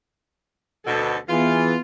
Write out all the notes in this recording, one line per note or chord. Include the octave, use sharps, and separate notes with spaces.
D2 B2 A4
E3 B3 F4 G#4